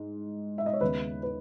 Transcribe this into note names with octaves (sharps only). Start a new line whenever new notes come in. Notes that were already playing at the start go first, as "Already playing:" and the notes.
Already playing: G#2
E5
D#5
C#5
D#2 C#3 G#3 B3 B4
B4